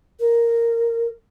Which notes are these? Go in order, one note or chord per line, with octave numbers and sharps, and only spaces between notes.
A#4